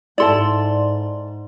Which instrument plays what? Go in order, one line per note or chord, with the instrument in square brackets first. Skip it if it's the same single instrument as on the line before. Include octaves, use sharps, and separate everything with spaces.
[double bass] G#2 [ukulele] E4 A4 A5 [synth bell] D5 C6